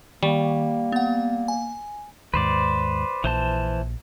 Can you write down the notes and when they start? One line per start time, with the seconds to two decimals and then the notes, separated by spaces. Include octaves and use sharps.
0.23 D#3 G3 A#3
0.92 B3 F#5
1.48 G#5
2.34 D#2 G#2 B4 C5 D5
3.24 A#1 E3 C5 A5